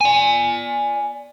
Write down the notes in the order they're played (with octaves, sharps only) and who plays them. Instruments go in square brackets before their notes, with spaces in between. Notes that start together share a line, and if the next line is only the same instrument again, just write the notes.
[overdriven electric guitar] D5 G#5